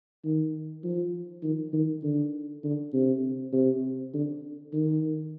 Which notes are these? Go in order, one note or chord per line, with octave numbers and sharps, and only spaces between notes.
D#3
F3
D#3
D#3
D3
D3
C3
C3
D3
D#3